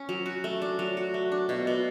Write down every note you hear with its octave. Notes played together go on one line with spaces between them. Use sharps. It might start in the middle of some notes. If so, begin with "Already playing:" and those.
Already playing: C#4
F#3
F#4
A3
D4
F#3
F#4
A3
D4
B2
B2